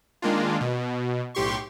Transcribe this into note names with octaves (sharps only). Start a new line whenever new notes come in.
D#3 G#3 A#3 D4 F4
B2
B1 A2 G4 C6 C#6